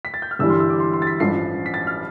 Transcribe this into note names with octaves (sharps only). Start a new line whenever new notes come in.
B6
A6
G6
F6
G1 G2 E3 G3 E6
C6
E6
D6
C6
C6
A6
B6
A1 G2 F3 C7
B6
A6
F6